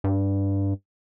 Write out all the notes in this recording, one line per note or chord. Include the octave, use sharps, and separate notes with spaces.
G2